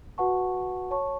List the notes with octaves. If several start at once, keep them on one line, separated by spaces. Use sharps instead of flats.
F#4 B4 F#5 A5 C#6
C#5 A5 C#6